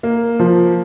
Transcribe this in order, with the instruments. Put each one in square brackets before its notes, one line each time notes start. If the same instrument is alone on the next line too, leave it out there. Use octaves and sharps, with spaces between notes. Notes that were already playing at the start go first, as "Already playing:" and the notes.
[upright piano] A#3
F3